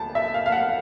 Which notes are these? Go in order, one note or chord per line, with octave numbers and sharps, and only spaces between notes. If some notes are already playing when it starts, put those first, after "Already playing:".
Already playing: D2 A5
E5
F5
F5
F#5